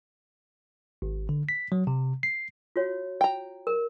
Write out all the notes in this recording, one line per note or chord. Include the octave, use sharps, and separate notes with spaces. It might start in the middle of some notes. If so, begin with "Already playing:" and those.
G#1
D3
B6
F#3
C3
C7
F4 F#4 C#5
G5 A#5
A#4